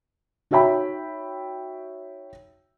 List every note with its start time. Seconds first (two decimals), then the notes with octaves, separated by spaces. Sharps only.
0.51 D#4 F#4 C#5 E5 G5 B5